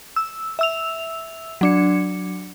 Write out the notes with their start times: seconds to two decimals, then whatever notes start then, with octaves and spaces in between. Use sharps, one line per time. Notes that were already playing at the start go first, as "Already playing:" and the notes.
0.16 E6
0.59 E5 E6 F7
1.61 F#3 D4 C#7